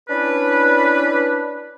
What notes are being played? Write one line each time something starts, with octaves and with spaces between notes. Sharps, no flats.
C#4 D4 E4 B4